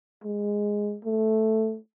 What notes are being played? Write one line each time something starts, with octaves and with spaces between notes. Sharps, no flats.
G#3
A3